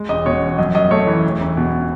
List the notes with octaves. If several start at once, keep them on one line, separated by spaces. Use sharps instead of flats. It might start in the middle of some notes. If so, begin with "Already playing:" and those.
Already playing: G#3
E1 D#5
B2 C#5
E2
F#2 D#5
F#2 D#5
A3 C#5
E3
E1
E1
B2